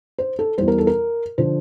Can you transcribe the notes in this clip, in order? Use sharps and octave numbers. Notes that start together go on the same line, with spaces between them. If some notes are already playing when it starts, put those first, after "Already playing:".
C5
A4
E2 E3 G3 C5
A#4
A4
A#4
D3 F3 C5